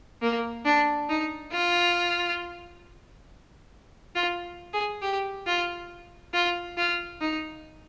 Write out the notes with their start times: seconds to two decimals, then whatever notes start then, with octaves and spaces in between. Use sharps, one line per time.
0.22 A#3
0.65 D4
1.09 D#4
1.53 F4
4.15 F4
4.73 G#4
5.02 G4
5.46 F4
6.34 F4
6.77 F4
7.21 D#4